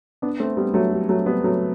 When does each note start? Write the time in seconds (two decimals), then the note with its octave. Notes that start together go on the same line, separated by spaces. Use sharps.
0.22 B3 D4
0.40 A3 C4
0.57 G3 B3
0.74 F#3 A3
0.92 G3
1.09 F#3 A3
1.26 G3 B3
1.44 F#3 A3